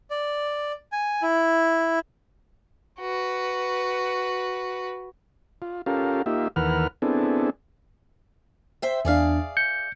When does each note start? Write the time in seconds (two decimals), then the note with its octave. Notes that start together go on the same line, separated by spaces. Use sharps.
0.11 D5
0.92 G#5
1.22 E4
3.00 F#4 B4
5.62 F4
5.86 C#4 F4 G4 A4 A#4 F5
6.26 A#3 D#4 F4 G4 E5
6.56 D#2 E3 A#4 B4 F#5 F6
7.02 B3 C4 D4 E4 G#4 A4
8.82 C5 E5 G5
9.05 E2 D4 G#4 D5 F5
9.57 G6 C#7